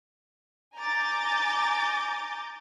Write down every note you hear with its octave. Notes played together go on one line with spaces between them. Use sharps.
G#5 A#5 D6 G6 A6